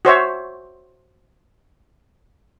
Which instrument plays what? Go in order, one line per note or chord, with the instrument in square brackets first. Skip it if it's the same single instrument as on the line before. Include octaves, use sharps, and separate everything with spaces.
[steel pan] F#4 C5 C#5 E5